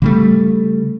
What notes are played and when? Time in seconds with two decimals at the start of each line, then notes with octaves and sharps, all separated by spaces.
0.02 C#3 G3 A3